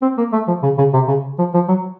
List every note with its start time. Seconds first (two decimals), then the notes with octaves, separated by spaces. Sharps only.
0.02 C4
0.18 A#3
0.33 A3
0.48 F3
0.63 C#3
0.78 C#3
0.93 C3
1.08 C#3
1.38 F3
1.54 F3
1.69 F#3